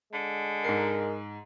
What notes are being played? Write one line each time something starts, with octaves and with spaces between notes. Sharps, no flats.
D3 G#3
G#2 A#4 C7